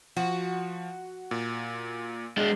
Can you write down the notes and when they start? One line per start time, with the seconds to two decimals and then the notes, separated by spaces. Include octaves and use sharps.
0.17 F3 F#4
1.31 A#2
2.37 G#3 D4